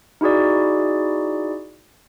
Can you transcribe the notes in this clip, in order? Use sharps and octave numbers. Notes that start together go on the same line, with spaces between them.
D#4 E4 F#4 G#4 D5